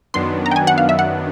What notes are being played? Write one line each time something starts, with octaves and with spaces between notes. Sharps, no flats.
F#2 D#3 F#3 B3 D4 C6
A#5
G5
G#5
F#5
F5
E5
F#5